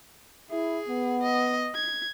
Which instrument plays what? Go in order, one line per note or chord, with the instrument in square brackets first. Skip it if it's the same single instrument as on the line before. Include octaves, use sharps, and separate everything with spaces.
[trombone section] E4 [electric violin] G#4
[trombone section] B3
[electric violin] D#5
G#6